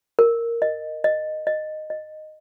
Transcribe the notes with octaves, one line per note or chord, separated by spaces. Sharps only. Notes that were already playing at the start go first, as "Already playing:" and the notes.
A#4
D#5
D#5
D#5
D#5